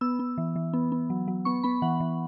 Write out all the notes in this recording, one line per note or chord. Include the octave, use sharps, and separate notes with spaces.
B3 E6
B3
E3
E3
B3
B3
F#3
F#3
B3 C#6
B3 B5
E3 F#5
E3